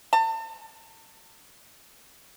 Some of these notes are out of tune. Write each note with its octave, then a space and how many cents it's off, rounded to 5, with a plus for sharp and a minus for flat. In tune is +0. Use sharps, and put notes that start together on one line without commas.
A5 +40